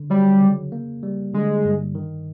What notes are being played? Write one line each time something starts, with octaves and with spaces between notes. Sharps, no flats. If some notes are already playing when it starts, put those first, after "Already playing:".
Already playing: D3
F#3 G3
C#3
A#3
G3
D3 G#3
G2
D#3